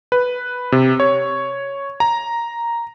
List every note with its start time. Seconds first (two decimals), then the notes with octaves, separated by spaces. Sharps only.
0.12 B4
0.72 C3
1.00 C#5
2.00 A#5